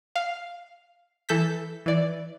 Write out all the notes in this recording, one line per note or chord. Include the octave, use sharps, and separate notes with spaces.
F5
E3 A4 G6 B6
E3 D5